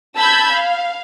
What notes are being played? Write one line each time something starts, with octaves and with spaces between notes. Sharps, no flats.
A5 B5 E6 G6 G#6
F5